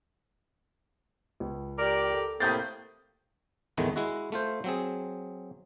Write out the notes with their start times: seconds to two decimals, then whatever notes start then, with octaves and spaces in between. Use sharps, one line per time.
1.40 C#2
1.79 G4 A#4 D5
2.13 A4
2.40 A2 C3 A#3 D#6 G6 A6
3.77 E2 A2 D#3 G#3 A3 B3
3.96 G#3 E4 F#4
4.32 A3 F4 C5
4.64 F#3 C4 G#4